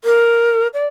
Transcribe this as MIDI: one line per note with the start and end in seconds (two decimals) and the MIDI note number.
0.04 0.67 70
0.74 0.87 74